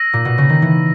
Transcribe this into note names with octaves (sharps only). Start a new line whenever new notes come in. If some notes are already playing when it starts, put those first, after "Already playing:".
Already playing: E6 A#6 D#7
A#2
B2
C#3
D#3
E3